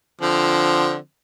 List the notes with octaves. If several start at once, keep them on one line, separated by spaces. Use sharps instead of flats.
D3 F3 C4